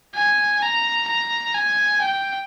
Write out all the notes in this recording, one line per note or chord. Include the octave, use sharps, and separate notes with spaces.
G#5
A#5
A#5
G#5
G5